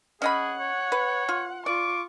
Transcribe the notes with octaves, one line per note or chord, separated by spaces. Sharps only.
C#4 G#4 D#5 F#5 B5
C#5
B4
F4
F4 D5 C#6 D6